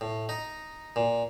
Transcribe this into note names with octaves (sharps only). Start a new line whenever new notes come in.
A2
D#4
A#2